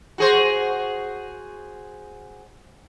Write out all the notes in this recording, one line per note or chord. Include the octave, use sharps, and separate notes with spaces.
F#4 G#4 C5